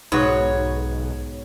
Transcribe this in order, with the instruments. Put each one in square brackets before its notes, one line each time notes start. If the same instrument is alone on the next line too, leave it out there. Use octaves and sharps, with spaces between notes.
[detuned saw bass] B1 [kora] G#2 B3 F#4 [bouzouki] C#5